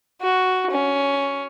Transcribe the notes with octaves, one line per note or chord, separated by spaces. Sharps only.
F#4
C#4